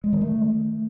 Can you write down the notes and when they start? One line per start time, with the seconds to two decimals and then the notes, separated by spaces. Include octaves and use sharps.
0.04 G#3
0.12 D#3
0.21 A3